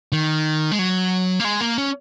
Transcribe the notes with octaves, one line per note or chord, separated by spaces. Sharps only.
D#3
G#3
F#3
A#3
G#3
A#3
C#4